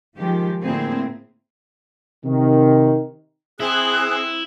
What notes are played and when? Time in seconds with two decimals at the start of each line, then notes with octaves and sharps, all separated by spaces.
0.16 D#3 F3 G#3 G4
0.62 A2 D3 A#3 C4 E4 G#4
2.25 C3 D#3
3.60 C4 E4 G#4 F#6